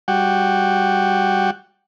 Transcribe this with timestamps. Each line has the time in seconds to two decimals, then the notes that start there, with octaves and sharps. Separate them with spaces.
0.08 G3 F#4 F#5 G5